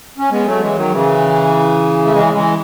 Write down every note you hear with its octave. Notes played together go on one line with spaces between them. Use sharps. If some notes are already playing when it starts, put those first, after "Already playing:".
C#4
G#3 B3
F#3 A3
E3 G#3
D#3 F#3
C#3 E3
A3
E3 G#3
E3 G#3